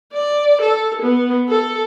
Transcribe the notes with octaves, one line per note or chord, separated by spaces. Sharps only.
D5
A4
B3
A4